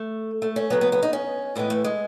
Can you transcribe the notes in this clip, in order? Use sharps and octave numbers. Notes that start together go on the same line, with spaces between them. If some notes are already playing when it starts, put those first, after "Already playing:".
Already playing: A3
A3
C#4
C#3 F#3 B3
B3
B3
D#4
C#4
A2 E3 G#3 B3
A3
G#3